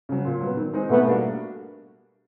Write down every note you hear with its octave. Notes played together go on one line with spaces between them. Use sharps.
C#3 F#3
A#2
F#3 B3
D#3
G#3 C4 D#4 G#4
B2 A3 B3
G3 A#3 D4 F#4